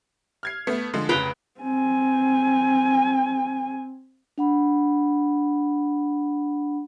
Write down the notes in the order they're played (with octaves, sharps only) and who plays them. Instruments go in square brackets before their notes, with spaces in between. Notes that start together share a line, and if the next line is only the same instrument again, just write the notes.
[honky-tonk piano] F6 G#6 C7
A3 B3
D3 F3 G#3
[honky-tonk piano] F1 C#3 F#6 [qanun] B4 G5 A#5
[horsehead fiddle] C4 G#5
[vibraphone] D4 F#5 B5